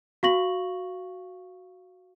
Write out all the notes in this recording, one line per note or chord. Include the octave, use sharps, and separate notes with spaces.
F#4 F5 C#6 A#6 F#7